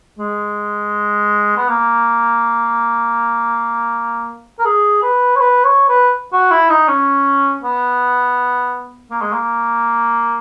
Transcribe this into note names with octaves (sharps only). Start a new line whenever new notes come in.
G#3
B3
A#3
A#4
G#4
B4
C#5
B4
C#5
B4
F#4
E4
D#4
C#4
B3
A#3
G#3
A#3